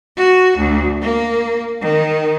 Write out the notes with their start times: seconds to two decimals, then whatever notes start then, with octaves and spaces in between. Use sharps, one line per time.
0.16 F#4
0.57 D2
1.00 A#3
1.80 D#3